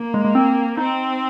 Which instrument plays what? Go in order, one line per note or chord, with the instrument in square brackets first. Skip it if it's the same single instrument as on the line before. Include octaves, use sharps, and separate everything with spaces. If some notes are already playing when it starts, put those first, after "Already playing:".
Already playing: [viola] A#3
[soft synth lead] G#3
G#3
C4
[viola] C4 [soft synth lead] D#4